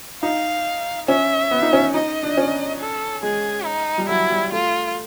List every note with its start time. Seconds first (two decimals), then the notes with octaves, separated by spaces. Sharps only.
0.23 D#4 F5
1.08 C#4 E5
1.51 B3
1.62 D#4
1.73 C#4
1.94 D#4 D#5
2.23 D4
2.37 C#4
2.80 A4
3.23 G#3 G#4
3.65 D#4
3.98 G3
4.09 F#3 E4
4.30 G3
4.52 A3 F4